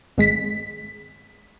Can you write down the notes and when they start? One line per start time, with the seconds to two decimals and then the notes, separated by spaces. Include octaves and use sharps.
0.18 G#1 G#3 B6